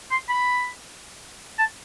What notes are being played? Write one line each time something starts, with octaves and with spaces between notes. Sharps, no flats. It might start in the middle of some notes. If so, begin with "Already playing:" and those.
C6
B5
A5